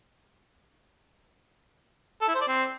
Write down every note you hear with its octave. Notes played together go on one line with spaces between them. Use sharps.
A4
E4
C5
D5
C4